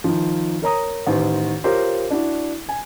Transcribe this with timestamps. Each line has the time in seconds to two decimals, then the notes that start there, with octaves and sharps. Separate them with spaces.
0.04 D#3 F3
0.62 A#4 C#5 A#5 D#6
1.06 A1 D#3 C5
1.64 F4 G4 A#4 C5 C#5
2.10 D4 E4 F#4
2.69 G#5